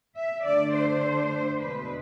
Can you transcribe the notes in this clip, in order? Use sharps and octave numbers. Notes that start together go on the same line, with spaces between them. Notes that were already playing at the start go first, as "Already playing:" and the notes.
E5
D3 A3 D4 D5
C5
E2 B2 G#3 B4